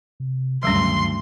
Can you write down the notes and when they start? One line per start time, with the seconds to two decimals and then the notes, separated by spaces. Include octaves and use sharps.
0.20 C3
0.63 D2 G2 D#3 F#3 G3 C#4 C6